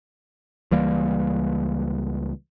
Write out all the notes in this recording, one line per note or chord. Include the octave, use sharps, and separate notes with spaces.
C#2 E3 G3 A#3